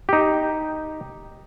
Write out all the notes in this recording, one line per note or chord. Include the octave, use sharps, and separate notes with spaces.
D#4 G4